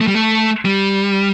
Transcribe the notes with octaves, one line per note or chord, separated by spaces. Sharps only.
A3
G3
A3
G3